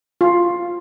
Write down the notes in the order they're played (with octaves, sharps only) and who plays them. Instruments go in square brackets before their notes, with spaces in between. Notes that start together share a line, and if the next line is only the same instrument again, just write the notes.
[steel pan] F4